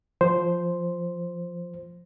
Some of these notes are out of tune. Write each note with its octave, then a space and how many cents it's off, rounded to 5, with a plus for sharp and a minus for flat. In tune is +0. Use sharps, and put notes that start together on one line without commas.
F3 +0 C5 +0